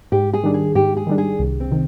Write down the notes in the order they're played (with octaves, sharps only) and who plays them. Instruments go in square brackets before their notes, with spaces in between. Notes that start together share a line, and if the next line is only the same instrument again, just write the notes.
[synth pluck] G#2 [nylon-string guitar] G4
[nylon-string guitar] G#4
[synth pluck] D#3 G3 D4
[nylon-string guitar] G#4
[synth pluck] G#2 [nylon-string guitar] G4
[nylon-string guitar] G#4
[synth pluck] D#3 G3 D4
[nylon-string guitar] G#4
[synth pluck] C2
[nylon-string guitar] C4
[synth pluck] C3 D#3